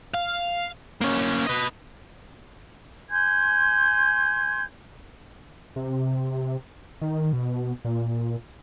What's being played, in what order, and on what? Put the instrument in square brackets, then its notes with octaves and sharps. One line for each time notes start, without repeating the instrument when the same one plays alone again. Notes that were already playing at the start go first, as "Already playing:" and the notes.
[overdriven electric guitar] F5
A#3 C#4
B4 D#5
[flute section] G#5 C6 G6 G#6
[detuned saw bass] C3
D#3
B2
A#2